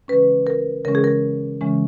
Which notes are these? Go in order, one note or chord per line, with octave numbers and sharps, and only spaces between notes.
C#3 E3 G#3 C#4 B4
A#4
C#3 E3 G#3 C#4 A#4
G#4
A#4
C#3 E3 G#3 C#4